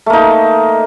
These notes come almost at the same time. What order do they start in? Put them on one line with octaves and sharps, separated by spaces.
A3 A#3 D#4